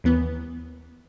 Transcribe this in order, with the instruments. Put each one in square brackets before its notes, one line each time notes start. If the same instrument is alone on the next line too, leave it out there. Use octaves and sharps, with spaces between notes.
[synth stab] D#2 E3 B3